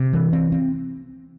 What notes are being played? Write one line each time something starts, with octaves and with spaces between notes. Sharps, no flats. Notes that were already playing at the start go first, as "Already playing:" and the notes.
Already playing: C3
E3
C4
C4